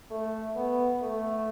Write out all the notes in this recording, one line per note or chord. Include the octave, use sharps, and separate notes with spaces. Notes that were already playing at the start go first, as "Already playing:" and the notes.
A3
B3
A3